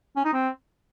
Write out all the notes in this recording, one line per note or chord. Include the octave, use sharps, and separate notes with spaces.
C#4
D#4
C4